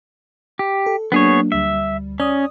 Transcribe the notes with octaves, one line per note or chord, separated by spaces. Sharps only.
G4
A4
F#3 A#3 B3 D4 G#4 C#5
D2 G3 E5
C#4 D5 D#6